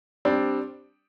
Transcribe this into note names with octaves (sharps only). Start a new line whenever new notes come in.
G3 C4 D4